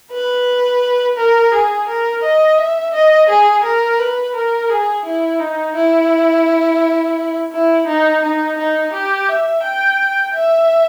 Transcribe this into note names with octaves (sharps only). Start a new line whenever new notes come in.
B4
A#4
G#4
A#4
D#5
E5
D#5
G#4
A#4
B4
A#4
G#4
E4
D#4
E4
E4
D#4
D#4
D#4
G4
E5
G5
E5